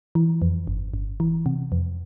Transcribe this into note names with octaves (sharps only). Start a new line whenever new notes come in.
E3
F2
G1
G1
E3
C3
F2